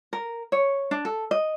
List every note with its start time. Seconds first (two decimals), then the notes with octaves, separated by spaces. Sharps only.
0.13 A#4
0.52 C#5
0.91 D4
1.05 A4
1.31 D#5